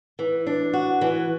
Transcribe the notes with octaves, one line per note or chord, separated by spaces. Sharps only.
E3
D4
F#4
E3